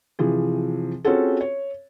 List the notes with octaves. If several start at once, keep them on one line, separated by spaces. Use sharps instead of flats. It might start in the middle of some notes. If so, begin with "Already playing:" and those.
C3 E3 F3 G#4
C4 C#4 F4 F#4 G#4 A4
C#5